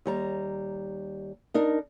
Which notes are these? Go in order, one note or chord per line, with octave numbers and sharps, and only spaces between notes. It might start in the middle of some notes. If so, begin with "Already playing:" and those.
D#2 G3 A#5
D4 D#4 A#4